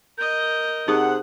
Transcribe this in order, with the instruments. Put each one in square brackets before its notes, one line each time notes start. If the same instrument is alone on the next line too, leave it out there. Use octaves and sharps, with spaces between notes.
[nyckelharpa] A#4 D#5 [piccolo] G6
[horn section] C3 C5 F#5 [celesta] D#4 G#4 D#6